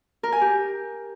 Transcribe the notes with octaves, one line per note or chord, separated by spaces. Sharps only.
A#4
G#5
G4